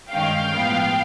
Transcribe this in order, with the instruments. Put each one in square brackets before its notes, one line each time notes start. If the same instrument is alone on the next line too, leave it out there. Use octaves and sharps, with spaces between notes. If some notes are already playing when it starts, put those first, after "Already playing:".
[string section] G2 D#3 G#3 C#4 F5 G5
A2 F3 G#3 B3